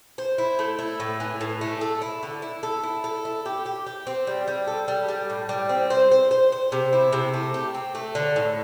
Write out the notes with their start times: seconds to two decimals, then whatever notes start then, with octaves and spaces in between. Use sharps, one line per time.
0.18 C5
0.38 E4
0.59 A3
0.79 E4
1.00 A2
1.20 E3
1.41 A2
1.61 A3
1.81 A4
2.02 E4
2.23 D3
2.42 E4
2.63 A4
2.83 E4
3.04 A4
3.25 E4
3.46 G4
3.66 G4
3.87 G4
4.07 C4
4.27 G3
4.48 G3
4.67 A4
4.88 G3
5.08 G3
5.30 A2
5.49 G3
5.69 C4
5.90 C5
6.11 C5
6.31 C5
6.52 C5
6.72 C3
6.93 E4
7.13 C3
7.34 A3
7.54 G4
7.74 C4
7.95 A3
8.15 D3
8.36 A2